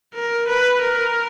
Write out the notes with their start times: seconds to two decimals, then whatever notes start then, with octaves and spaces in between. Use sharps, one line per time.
0.15 A#4
0.48 B4
0.81 A#4